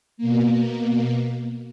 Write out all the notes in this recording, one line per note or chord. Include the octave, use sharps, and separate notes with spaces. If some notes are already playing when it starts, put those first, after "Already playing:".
B2 A#3